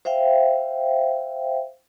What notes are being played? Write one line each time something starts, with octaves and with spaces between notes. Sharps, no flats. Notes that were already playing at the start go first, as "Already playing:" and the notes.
C5 E5 F5 G5